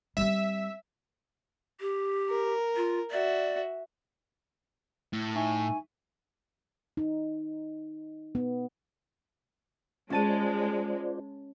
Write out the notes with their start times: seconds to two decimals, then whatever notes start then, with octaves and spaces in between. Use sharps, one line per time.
0.17 G3 C4 E5
1.81 G4
2.29 A#4
2.76 F4
3.11 F#4 D5 E5
5.13 A2
5.36 D#4 E5 G#5 C#6
6.97 D#4
8.35 B3
10.10 G#3 C#4 F4 C5 D5 A5 D#7